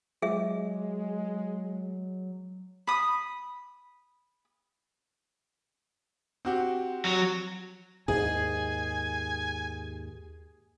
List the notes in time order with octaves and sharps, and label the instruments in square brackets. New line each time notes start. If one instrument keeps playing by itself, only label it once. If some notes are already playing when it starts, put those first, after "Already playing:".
[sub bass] F#3 [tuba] G#3 [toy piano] G#4 E5
[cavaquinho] B5 D#6
[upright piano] C4 F#4 G4
[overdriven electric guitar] F#3
[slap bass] D#2 G#2 [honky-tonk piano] G#4 [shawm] G#5